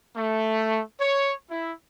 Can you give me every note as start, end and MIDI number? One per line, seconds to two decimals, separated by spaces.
0.16 0.80 57
1.00 1.34 73
1.50 1.73 64